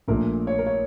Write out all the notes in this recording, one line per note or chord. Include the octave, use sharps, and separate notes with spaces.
A#1 A#2 A3 A#4
C#5
A#4
C#5